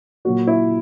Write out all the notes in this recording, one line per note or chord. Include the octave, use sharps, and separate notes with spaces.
A#2 F#3 A#3 F#4
E4